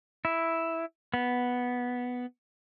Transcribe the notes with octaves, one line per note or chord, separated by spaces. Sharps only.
E4
B3